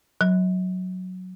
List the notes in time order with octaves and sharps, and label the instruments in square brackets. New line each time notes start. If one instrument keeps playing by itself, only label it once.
[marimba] F#3